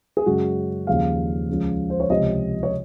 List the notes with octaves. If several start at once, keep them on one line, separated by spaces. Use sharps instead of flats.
G#4
F#2 C#3 G#3 F#4
D#2 C#3 F3 G#3 F5
C#2 C#3 F3
C5
C#5
C#2 C3 F3 D#5
C#5